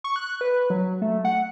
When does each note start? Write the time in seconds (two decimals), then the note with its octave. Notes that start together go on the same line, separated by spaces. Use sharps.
0.04 C#6
0.16 F#6
0.41 B4
0.70 F#3
1.02 A3
1.25 F#5